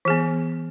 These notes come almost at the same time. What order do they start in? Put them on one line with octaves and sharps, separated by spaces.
E3 G#4 B3